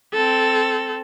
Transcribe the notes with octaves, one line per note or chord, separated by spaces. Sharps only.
C4 A4